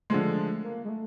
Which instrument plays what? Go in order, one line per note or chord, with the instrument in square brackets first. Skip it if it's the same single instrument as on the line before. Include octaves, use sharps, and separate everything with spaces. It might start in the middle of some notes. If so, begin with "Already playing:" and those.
[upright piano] D3 F3 G#3 [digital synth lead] A3
[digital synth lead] A#3
G#3
A3